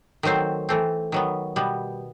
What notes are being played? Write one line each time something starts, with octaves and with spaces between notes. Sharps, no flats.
D#3 F#3 A3 C4 C5
E3 A3 C4
D#3 F#3 B3
B2 G3 B3